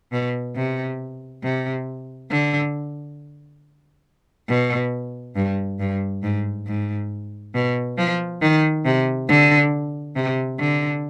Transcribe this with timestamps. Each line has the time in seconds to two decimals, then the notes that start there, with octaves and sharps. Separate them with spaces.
0.12 B2
0.56 C3
1.43 C3
2.30 D3
4.48 B2
5.36 G2
5.79 G2
6.23 G#2
6.67 G#2
7.54 B2
7.97 F3
8.42 D#3
8.85 C3
9.28 D3
10.15 C3
10.59 D3